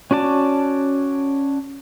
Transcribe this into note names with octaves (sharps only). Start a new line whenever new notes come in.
C#4 F#4 D5 A5